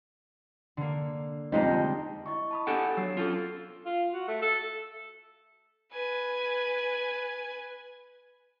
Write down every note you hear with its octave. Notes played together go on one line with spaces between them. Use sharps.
D3 A#3
F2 F3 G3 G#3 C4 D#4
E4 D#5 C#6
A5 B5 D#6
B3 D4 G4 A4 F#5 G#5
F#3 E6 C7
C#4 F4 A4
F4
F#4
A3
A4
B4 G#5